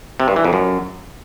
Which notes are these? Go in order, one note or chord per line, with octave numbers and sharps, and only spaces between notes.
C3
G2
E3
F2
F#2